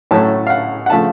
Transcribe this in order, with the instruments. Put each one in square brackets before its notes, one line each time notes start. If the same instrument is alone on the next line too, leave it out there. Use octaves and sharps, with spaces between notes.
[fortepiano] A2 F#3 A3 C#4 A5
F5
F#5
F#5
C#3 F3 A3 A5